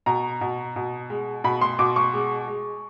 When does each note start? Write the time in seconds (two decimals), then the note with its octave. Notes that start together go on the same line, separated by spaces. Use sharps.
0.06 B2 A#5
0.41 B2
0.76 B2
1.10 G#3
1.44 B2 B5
1.61 C6
1.79 B2 D6
1.96 C#6
2.13 G#3
2.48 G#3